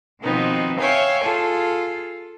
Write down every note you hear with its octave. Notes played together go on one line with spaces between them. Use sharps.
B2 D#3 F3 B3 C4 D#4
C#5 E5 F5 G5 G#5
F4 G#4 A4